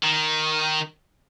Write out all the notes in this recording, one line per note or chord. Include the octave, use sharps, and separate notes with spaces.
D#3